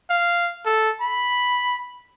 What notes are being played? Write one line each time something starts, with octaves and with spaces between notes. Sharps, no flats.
F5
A4
B5